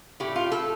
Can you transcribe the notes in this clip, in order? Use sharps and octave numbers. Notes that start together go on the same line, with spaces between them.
A2 A3 G4
F4
A4